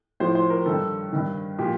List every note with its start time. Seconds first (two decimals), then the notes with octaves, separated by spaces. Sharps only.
0.20 A2 F3 C5
0.35 C5
0.50 A#4
0.66 G2 D#3 A4
1.12 G2 D#3
1.58 A#2 F3 G4